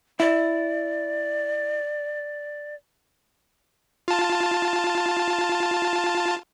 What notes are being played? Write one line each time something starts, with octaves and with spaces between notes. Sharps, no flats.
E4 D5
F4 A5